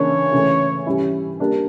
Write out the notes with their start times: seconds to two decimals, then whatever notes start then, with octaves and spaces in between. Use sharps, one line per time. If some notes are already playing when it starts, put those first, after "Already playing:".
Already playing: C#3 E3 A#3 D4 C#5
0.33 C#3 E3 A3
0.86 E3 G3 C#4 E4
1.40 G3 A#3 D4